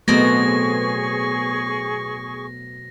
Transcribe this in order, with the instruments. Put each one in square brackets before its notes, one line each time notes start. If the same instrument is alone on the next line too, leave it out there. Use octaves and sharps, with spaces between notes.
[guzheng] B2 F#3 C4 [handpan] A3 B3 [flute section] G#4 C#6 [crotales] A#6